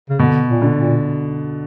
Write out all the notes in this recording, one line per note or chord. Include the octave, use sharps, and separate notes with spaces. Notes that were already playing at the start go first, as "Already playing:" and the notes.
C#3
B2 D3
A#2
D3
A#2